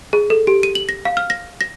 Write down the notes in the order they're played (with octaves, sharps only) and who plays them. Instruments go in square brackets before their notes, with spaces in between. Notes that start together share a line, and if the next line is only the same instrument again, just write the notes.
[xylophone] G#4
A4
G4
D#7
F#7
A#6
F5
F6
A#6
A#6